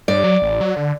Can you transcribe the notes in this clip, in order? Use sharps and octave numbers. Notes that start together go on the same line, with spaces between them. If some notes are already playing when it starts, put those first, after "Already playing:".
G2 D5
F#3
A1
F#3
D3